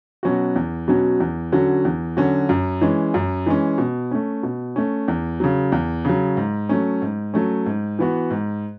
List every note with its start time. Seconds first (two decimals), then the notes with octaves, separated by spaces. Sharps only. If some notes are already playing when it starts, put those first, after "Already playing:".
0.23 B2 F#3 C#4 F#4
0.56 E2
0.88 B2 F#3 C#4 F#4
1.20 E2
1.52 D3 F#3 C#4 F#4
1.85 E2
2.17 D3 F#3 C#4 F#4
2.49 F#2
2.81 E3 G#3 C#4
3.14 F#2
3.46 E3 G#3 C#4
3.78 B2
4.11 A3 C#4
4.43 B2
4.76 A3 C#4
5.08 E2
5.40 C#3 F#3
5.72 E2
6.05 C#3 F#3
6.37 G#2
6.69 F#3 A3 C#4
7.02 G#2
7.34 F#3 A3 C#4
7.66 G#2
7.99 E3 B3 F#4
8.30 G#2